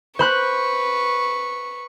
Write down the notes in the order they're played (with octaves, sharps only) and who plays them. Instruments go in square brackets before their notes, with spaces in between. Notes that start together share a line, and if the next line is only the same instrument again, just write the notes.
[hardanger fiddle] B4 C#6 [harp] C5 B5 F#6